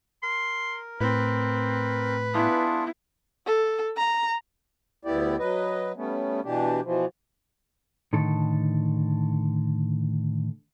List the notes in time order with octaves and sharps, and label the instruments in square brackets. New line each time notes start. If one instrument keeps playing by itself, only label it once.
[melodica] A#4 [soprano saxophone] C6
[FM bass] A2 [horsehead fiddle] C4 [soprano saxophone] B4
[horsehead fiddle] B3 E4 [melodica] D4 F4 G#4
[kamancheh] A4
A#5
[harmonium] D2 B3 E4 G4 D5
F#3 B4 D#5
G3 A3 B3 C#4
B2 E3 D4 G4
B2 E3 F3
[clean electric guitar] A2 D3 D#3 A4